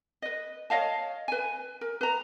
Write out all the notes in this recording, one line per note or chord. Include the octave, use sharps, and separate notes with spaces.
B4 D#5
C#5 D#5 F5 A5
B4 G#5
A#4
B4 A#5